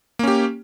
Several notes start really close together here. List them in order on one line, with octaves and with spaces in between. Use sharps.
A#3 C#4 G4